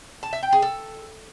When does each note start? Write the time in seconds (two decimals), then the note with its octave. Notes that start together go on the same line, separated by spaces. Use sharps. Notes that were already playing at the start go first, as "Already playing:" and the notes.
0.23 A5
0.33 E5
0.43 G5
0.53 G#4
0.62 A4